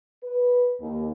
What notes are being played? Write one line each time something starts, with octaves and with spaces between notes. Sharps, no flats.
B4
D#2